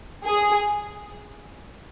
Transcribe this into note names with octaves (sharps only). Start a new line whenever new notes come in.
G#4